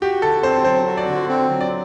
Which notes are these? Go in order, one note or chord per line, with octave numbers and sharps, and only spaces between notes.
F#4 G4
D3 A4
C4 C5
F#3 C5
F#4
D5
D3
C4
F#3
D5